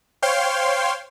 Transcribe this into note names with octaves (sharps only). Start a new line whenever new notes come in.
C5 C#5 F5 G5 C6